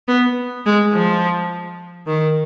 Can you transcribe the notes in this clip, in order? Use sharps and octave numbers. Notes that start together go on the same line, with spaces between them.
B3
G#3
F3
D#3